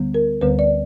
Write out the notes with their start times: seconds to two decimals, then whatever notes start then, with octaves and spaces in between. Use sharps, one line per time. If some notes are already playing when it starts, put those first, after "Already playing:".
Already playing: D2 D3 G3 B3
0.14 A#4
0.41 D2 D3 G3 B3 B4
0.59 D5